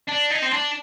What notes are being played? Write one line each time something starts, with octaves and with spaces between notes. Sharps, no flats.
D4
D#4
C4
D4